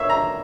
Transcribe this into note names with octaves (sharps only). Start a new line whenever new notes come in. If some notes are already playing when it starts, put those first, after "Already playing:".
Already playing: A#3 C#5 E5
A#5